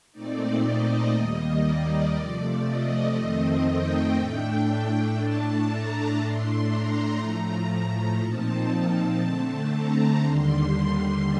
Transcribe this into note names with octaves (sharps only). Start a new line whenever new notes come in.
A#2 A3 C4 D#4 D5
D#5
D#2 D#3 G3 A#3 D#5
D5
C3 F3 A3
D#5
F2 D#3 A3 C4
G5
A2 A3 D4 G5
A2 A3 D4 A5
A#5
A2 A3 D4 C6
A#5
A2 F3 A3 A#5
A#2 F3 C4 D#4 A5
A5
D3 A3 C4
A#5
D#2 D3 G3 C6